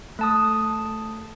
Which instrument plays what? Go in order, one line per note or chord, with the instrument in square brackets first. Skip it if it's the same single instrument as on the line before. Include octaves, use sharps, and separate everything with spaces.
[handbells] A3 A5 D#6